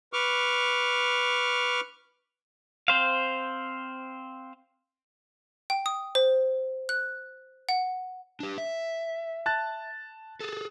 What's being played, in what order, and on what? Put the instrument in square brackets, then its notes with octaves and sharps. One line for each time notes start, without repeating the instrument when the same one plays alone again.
[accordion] B4 C#6 D6 F6
[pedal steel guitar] C4 C5 F5
[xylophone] G5
D#6
C5
F#6
F#5
[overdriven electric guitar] D4 G4
E5
[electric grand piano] A5 F#6 A6
[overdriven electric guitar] G#4 A4